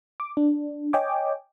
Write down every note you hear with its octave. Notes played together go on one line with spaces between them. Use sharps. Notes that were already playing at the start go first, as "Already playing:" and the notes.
D6
D4
C#5 D#5 G5 G#5 D6